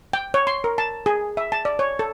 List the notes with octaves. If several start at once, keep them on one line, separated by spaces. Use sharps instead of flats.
G5
C#5
C6
A#4
A5
G#4
E5
A5
D5
C#5
A4